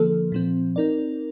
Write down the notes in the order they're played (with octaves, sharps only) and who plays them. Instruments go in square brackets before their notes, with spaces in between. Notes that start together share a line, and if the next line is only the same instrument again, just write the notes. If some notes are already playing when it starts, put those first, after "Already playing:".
Already playing: [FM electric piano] D3 F3 A#3 [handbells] A4
[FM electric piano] A#2 F3 C4
C4 D#4 A#4 D5